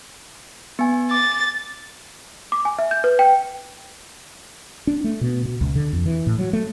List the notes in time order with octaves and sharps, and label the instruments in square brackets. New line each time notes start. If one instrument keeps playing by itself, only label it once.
[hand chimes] B3 G#5
[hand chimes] D6 [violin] A6
[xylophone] D6
G#5
E5
G6
B4
G5
[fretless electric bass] D4
A3
B2
B2
C#2
D3
F2
E3
A2
F#3
A3